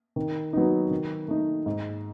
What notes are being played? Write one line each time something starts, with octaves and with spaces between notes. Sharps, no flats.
D#3
F#3 B3 D#4
D#3
A3 D#4
G#2